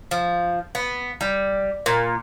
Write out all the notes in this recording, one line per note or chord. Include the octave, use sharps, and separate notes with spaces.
F3
B3
G3
A#2